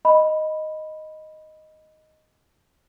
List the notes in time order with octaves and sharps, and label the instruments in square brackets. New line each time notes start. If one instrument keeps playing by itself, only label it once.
[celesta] D#5 B5